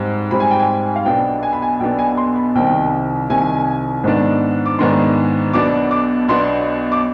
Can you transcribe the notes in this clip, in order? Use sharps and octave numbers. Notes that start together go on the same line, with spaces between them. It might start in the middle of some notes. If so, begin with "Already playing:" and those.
Already playing: G#2 G3 C4
G#2 G3 C4 B5
G#5
G5
G#5
F5
B1 B2 B3 D4 G5
G#5
B5
G#5
B1 B2 B3 D4 G5
G#5
C6
B5
C2 C3 D#3 G5
C2 C3 D#3 G#5
G#2 D#3 B3 D4
D6
G#2 D#3 B3 D4 C6
B1 B2 B3 D4 D6
D6
B1 B2 B3 D4 C6
D6